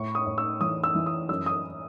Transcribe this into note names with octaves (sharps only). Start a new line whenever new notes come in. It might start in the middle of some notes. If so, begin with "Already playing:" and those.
Already playing: A2 C#6
D#6
A2
E6
E3 D#6
E6
E3
D#6
F#2 E6
D#6